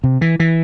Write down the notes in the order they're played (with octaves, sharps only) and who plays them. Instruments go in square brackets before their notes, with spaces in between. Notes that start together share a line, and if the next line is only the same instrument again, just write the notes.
[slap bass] C3
E3
E3